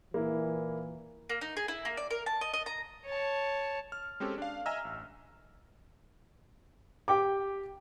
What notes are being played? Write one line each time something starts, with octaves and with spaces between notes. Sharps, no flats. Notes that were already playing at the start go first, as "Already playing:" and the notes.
A#2 E3 A#3 E4
A#3
D#4
G#4
E4
A#3
D5
A#4
A5
D#5
D#5
A#5
C#5 A5
F6
G#3 C4 C#4 G4 A4
D4 F5
D#5 E5 G#5 A#5 E6 F6
A1
G4 G5 D6